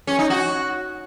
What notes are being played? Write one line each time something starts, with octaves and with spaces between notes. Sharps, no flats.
C#4
D#4
F#4